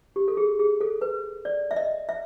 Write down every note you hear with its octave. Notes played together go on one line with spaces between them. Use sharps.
G4
A4
G#4
G#4
A4
B4
D5
E5
D#5
E5